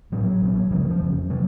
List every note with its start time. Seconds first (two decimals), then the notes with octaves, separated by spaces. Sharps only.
0.12 A1 A2 F#3
0.41 A#1 A#2
0.70 C#2 C#3 F3
0.80 F#3
0.90 F3
1.00 F1 F2 C#3
1.30 C3 F#3